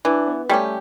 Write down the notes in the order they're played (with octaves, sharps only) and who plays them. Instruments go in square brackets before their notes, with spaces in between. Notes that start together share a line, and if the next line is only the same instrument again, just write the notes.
[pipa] E3 [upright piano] D4
[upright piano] B3
[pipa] G3 C#4 G4 [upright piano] A3